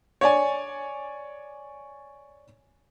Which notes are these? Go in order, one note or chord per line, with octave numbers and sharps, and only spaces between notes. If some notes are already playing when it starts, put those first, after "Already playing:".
C#5 D5 G#5